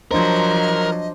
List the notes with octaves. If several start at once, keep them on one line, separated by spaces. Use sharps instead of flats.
F3 F#3 D4 A#4 C5 D#5